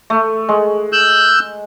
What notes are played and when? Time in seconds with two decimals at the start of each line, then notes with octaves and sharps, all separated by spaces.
0.10 A3
0.49 G#3
0.93 E6 F#6 G6